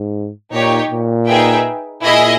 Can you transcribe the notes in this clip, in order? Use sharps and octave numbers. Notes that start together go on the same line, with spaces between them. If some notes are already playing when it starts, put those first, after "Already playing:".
Already playing: G#2
A#2 D#4 G4 C#5
A#2
D#4 G#4 B4 E5 G5
A#2 E4 G#4 D#5